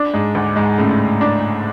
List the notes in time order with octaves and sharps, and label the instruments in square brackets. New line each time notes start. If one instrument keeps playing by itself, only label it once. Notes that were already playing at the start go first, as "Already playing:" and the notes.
Already playing: [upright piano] D4
[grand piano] G#2 G#3
[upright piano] D2
[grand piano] G#2 G#3
[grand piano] A2 A3 [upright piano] C#3
[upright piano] D4